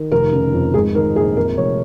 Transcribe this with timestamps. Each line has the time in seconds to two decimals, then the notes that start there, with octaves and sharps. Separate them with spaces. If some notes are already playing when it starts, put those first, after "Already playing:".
Already playing: D#3
0.12 F1 A#4
0.33 C#3
0.53 F2
0.74 G#2 G#4
0.95 D#3 A#4
1.16 A#1 G#4
1.37 F2 A#4
1.57 F1 C#5